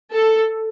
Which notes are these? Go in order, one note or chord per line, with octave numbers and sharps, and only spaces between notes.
A4